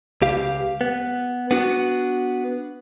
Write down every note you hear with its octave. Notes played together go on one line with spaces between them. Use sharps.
C#2 G4 F5
B3
B3 D4 F#4